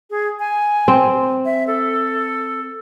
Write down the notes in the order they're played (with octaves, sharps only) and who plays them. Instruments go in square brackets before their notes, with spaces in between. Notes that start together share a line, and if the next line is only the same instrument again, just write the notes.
[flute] G#4
G#5
[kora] C4
[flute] E5
A4